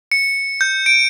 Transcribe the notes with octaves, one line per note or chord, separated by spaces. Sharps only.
C#7
G6
D7